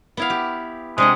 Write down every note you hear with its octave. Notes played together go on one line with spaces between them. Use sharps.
B3 E4 F5
G4
C3 G#3 D4 F#5